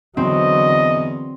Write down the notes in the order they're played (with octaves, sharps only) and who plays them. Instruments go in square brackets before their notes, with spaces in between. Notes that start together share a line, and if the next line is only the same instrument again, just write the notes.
[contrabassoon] E2 [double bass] D3 F#3 [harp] C4 [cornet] D#5